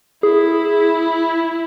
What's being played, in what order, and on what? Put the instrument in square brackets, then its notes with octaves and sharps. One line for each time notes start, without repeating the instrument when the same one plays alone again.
[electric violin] E4 [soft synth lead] G#4